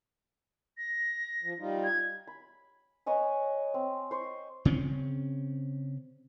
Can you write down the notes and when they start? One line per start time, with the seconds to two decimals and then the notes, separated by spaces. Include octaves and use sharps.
0.78 A#6
1.43 F3
1.59 G3 D#4 F4
1.84 G#6
2.27 B5
3.06 B4 C#5 D#5 G#5
3.74 C4
4.11 C5 C6 C#6
4.65 C#3 C4 C#4